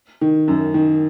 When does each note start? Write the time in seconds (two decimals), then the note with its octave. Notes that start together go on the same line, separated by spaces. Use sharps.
0.21 D#3
0.48 F#2
0.74 D#3